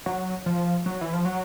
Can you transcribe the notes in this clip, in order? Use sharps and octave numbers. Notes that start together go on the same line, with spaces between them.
F#3
F3
F#3
E3
F3
F#3